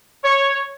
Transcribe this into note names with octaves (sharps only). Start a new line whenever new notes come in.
C#5